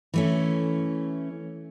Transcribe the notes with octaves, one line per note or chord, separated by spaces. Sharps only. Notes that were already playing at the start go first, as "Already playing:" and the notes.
E3 A3 C#4